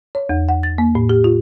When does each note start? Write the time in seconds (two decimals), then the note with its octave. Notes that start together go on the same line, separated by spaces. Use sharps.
0.15 C#5
0.29 E2
0.49 F#5
0.63 A6
0.78 A#3
0.95 A2
1.09 G4
1.24 F4